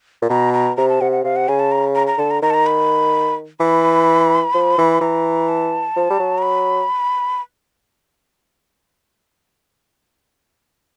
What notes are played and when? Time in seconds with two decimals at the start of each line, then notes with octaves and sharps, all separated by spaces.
0.22 A#2
0.30 B2 A#5
0.54 A#5
0.77 C3 A#5
0.89 A5
1.01 C3 F#5
1.12 F#5
1.24 C3 F5
1.36 F#5
1.48 C#3 G#5
1.59 A5
1.71 A#5
1.95 A#5
2.07 A#5
2.18 D3 A5
2.31 A#5
2.42 D#3 A#5
2.50 A5
2.54 A#5
2.66 B5
3.60 E3 B5
4.54 F3
4.78 E3
5.01 E3 A#5
5.49 A5
5.96 F3
6.10 G3
6.20 F#3
6.38 A#5
6.42 B5